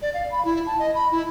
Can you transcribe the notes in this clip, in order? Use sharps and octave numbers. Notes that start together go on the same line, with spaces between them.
D5
F5
B5
E4
A5
D#5
B5
E4